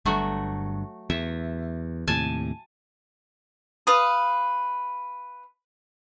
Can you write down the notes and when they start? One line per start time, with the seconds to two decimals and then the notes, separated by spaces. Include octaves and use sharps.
0.05 G1 G2 F#3 A3 F#4
1.10 E2 E5
2.07 D#2 A2 C3 G#5 A5
3.87 B4 F5 D#6